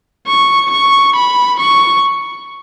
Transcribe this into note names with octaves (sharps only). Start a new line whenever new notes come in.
C#6
C#6
B5
C#6